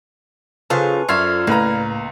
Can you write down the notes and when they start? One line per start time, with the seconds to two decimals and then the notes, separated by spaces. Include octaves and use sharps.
0.70 C#3 F#3 F4 A4 B4 C5 G#5 C#6
1.09 F#2 F4 D5 E5 C#6 F6 G#6
1.47 C#2 A2 A#3 B4 A#5